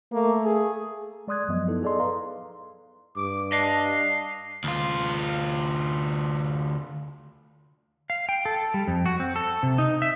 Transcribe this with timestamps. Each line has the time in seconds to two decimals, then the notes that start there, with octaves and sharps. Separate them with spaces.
0.13 A3 A#3
0.44 G#4
1.28 G#3 D5 C6 D#6 F#6 G#6
1.48 F#2 F3 F#3 B3 D#5
1.67 B3 D#4 E4 A4
1.83 G#4 A4 D5 D#5 C6
2.00 B4 F5 A#5 C6
3.17 G2 D6
3.52 D4 D#5 F5
4.64 D2 F4
8.10 F5
8.29 G5
8.45 A4
8.74 G3
8.88 F2
9.06 F#4
9.20 C4
9.36 A4
9.63 C3
9.78 D#4
10.02 E5